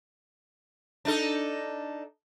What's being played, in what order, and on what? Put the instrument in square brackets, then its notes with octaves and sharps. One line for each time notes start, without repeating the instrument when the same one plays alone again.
[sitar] D4 D#4 A4